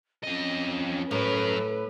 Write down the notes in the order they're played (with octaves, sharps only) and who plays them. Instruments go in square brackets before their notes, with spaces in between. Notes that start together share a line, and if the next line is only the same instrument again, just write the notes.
[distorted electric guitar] F2 D#5 [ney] C#4
[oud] A2 [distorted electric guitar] F#3 A#4 [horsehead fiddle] B4